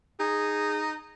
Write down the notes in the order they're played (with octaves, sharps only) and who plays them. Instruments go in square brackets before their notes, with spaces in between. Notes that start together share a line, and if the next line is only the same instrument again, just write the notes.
[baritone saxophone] D#4 [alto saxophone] G#4